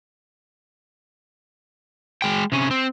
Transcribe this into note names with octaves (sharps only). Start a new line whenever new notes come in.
G#3 G5
C3 C#4
C4